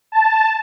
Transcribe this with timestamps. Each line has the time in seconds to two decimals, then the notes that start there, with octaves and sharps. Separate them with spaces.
0.12 A5